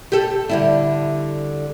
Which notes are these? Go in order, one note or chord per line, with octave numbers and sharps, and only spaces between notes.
G4 A4
D3 G3 E4